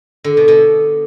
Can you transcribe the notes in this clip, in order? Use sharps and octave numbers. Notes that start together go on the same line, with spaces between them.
D3
B2
B2